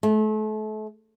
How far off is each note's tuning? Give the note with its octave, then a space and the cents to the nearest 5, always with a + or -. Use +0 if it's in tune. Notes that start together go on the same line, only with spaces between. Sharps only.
A3 -35